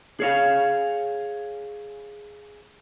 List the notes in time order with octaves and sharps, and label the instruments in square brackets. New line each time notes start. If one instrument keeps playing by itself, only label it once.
[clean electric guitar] G#4 C#5 F5